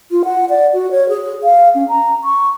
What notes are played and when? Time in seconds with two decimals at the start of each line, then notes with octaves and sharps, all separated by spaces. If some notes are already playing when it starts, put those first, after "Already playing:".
0.11 F4
0.25 F#5
0.50 D5
0.73 F#4
0.91 C#5
1.09 G#4
1.43 F5
1.75 C#4
1.89 A#5
2.24 C#6